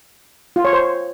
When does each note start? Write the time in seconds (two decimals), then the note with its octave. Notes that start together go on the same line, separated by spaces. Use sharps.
0.56 F4
0.65 C#5
0.73 C5